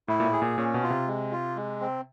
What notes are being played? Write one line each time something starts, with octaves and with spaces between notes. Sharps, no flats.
A2 E4
A#2
A2
G#4
A#2
A#2 C#4
B2
F4
C3
G#3
F4
G#3
C4